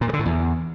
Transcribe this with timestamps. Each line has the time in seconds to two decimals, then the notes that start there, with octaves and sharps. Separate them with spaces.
0.01 A#2
0.07 G2
0.13 D3
0.19 A2
0.26 E2